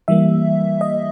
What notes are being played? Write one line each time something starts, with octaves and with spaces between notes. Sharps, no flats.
E3 G3 A#3 E5
D#5